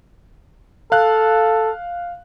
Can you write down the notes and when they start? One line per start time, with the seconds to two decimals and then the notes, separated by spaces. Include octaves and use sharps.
0.92 A4 F5 F#6